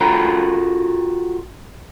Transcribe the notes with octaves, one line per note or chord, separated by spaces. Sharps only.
F4 F#4 A4 G5 A#5 B5